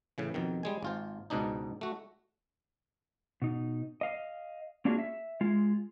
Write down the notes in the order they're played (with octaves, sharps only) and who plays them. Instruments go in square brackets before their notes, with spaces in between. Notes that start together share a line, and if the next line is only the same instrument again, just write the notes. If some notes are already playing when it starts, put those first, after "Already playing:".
[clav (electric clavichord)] A2 C#3 E3
F2 B2 D#3
G3 G#3 G#5
G#1 F4 C5
C#2 G#2 B2 D4 D#4
A3 F#4
[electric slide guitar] B2 D#4
D#5 F5
A#3 C#4 D4 F4 F#4 G#4
E5
G#3 F4